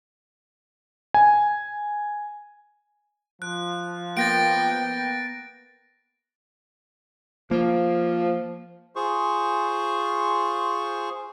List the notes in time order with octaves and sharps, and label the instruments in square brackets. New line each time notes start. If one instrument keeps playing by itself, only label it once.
[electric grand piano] G#5
[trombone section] F3 [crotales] F#6
[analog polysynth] A#3 B3 [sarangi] G5 [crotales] A6 A#6 D7
[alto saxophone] F3 [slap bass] A#3
[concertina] F4 G#4 C5 C#6